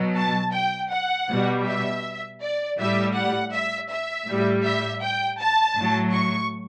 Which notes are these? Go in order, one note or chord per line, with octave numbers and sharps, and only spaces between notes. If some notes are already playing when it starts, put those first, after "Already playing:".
Already playing: B2 F#3
A5
G5
F#5
B2 G3
E5
D5
A2 G3 E5
F#5
E5
E5
A2 G3
E5
G5
A5
A2 F#3
C#6